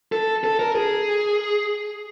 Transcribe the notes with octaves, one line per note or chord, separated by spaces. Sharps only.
A4
A4
A#4
G#4